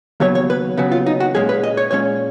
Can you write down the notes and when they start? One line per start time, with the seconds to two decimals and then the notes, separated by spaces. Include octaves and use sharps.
0.20 D#2 C#3 F#3 B3 C#5
0.35 C#5
0.50 B4
0.77 D#2 C#3 F#3 B3
0.92 F4
1.06 D#4
1.20 F#4
1.35 A#2 G#3 C#4 G#4
1.49 B4
1.63 D#5
1.77 C#5
1.91 A#2 G#3 C#4 C#5